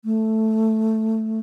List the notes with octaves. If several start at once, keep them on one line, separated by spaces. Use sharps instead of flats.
A3